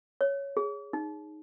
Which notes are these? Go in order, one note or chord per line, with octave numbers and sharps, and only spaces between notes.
C#5
G#4
D#4